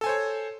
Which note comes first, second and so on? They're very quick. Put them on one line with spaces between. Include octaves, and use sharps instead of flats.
A4 G#5 C5 C#5